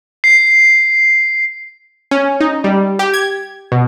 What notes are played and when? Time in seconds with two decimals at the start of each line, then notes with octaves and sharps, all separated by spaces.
0.24 C7
2.11 C#4
2.40 D#4
2.64 G3
2.99 G4
3.14 G#6
3.72 B2